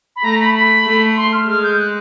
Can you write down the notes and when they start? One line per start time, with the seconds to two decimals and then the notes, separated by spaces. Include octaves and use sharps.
0.16 B5
0.24 A3 A#5
0.40 B5
0.55 B5
0.86 A3
1.17 C6
1.33 F6
1.48 G#3 F6
1.63 G6
1.79 F#6